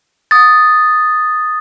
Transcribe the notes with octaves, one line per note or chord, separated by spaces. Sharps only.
D#6 A6